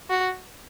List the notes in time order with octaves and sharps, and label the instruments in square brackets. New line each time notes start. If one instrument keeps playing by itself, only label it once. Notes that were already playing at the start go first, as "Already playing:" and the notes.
[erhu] F#4